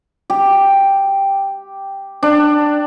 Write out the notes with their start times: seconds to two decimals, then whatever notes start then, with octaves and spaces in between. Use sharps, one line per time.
0.30 G4
2.23 D4